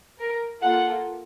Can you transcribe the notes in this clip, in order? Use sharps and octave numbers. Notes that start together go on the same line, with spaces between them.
A#4
A#3 F4 A4 F#5